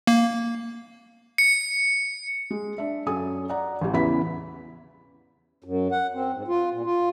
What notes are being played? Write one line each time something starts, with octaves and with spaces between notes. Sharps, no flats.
A#3
C#7
G#3
D4 E5
F#2 F#3 A4 G#5 D#6
D5 F#5 A#5
A1 G3
E2 C#3 E4 B4 B5 B6
F#2
F#5
C4
G#2
F4
A#2
F4